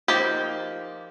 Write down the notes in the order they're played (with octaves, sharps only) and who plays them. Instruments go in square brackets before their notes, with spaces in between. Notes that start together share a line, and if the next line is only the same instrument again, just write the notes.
[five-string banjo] F3 A#3 D#4 G4